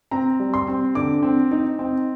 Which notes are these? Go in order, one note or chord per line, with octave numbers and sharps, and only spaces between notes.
C4 A#5
G3
C6
C4
D3 D6
C4
D#4
C4